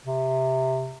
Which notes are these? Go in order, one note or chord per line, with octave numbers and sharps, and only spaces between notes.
C3